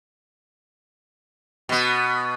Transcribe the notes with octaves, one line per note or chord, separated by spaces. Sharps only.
B2 B3